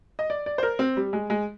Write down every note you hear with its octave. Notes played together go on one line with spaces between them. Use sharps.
D#5
D5
D5
C5
A#4
C4
G3
G#3
G#3